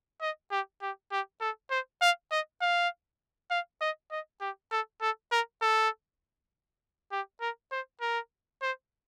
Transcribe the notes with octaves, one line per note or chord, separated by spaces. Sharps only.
D#5
G4
G4
G4
A4
C5
F5
D#5
F5
F5
D#5
D#5
G4
A4
A4
A#4
A4
G4
A#4
C5
A#4
C5